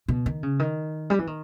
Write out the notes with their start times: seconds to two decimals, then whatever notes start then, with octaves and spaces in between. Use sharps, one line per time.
0.08 B2
0.26 D#3
0.43 C#3
0.60 D#3
1.10 G3
1.19 E3
1.27 D#3